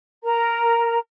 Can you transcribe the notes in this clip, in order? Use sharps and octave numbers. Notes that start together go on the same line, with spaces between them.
A#4 A#5